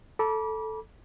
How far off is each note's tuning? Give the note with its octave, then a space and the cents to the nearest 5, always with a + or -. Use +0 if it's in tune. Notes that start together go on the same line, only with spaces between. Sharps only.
A4 +0 B5 -40 D6 -15